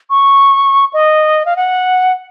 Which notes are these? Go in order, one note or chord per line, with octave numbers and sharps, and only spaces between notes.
C#6
D#5
F5
F#5